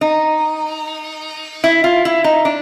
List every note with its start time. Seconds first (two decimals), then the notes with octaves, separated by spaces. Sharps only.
0.01 D#4
1.64 E4
1.84 F4
2.05 E4
2.24 D#4
2.45 D4